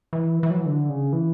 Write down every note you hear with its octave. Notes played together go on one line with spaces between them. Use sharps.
E3
E3
F#3
E3
D3
C#3
E3